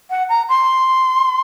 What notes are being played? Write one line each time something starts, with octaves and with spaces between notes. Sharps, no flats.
F#5
A#5
C6